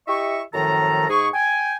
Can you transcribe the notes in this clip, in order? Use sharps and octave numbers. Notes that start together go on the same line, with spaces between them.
E4 G4 D#5 E5 C#6
F#2 A2 D#3 F3 A4 A#5
G#2 G#4 C#6
G5 G#5